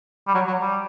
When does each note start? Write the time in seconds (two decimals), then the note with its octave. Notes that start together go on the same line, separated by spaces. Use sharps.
0.27 G3
0.35 F#3
0.47 F#3
0.61 G3